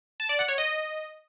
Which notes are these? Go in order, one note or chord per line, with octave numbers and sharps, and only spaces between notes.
A5
D5
F#5
C#5
D#5